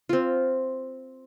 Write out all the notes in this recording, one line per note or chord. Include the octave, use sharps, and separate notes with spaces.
C4 F4